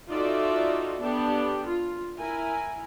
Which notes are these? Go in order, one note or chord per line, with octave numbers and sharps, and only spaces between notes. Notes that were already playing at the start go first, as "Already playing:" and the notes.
D#4 F4 F#4 A4 D5 E5
B3 D4 G4 A4
F4
E4 A#4 G#5